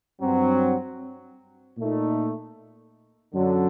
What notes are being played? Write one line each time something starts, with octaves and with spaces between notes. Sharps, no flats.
G2 F#3 C4
A#2 A3 D#4
F#2 D3 F#3